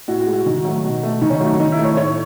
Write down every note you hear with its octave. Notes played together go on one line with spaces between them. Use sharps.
A2 F#4
F#4
G#3
F#4
D#3
F#3 A3
B2
A3
D#3 D#4
C#4
D#4
F#3 A3
D#4
D#3 D#4
E4
A3
C#5
A2 C#5